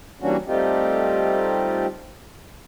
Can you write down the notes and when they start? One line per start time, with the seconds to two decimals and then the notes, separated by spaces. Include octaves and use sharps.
0.21 E3 G3 A#3 C#4 D4 F#4
0.47 G3 A3 C4 D#4 F4 G4